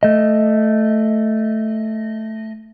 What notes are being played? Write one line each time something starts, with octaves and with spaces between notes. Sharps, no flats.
A3 D#5